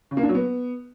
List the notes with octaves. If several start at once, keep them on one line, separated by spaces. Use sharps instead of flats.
C#3
A#3
D4
F#3
B3